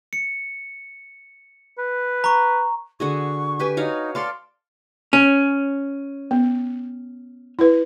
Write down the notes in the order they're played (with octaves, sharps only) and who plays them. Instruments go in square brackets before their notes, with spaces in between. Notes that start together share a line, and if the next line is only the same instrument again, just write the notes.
[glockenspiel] C#7
[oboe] B4
[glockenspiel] A#5 C#6
[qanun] D3 F#4 G#4 [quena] C#6
[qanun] G4 B4 G#5
[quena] D#4 [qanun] F#4 C#5 F5
[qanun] A4 D5 F5 [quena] C6
[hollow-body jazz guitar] C#4
[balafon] B3
E4 B4